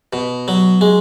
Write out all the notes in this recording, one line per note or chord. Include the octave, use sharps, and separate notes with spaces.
B2
F#3
G#3